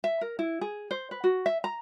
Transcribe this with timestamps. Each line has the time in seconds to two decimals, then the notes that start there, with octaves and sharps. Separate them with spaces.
0.04 E5
0.21 A#4
0.39 E4
0.61 G#4
0.91 C5
1.11 B4
1.24 F#4
1.46 E5
1.64 A#5